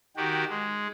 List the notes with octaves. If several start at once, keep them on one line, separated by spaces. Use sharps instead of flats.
D#3 F#4 G4
G#3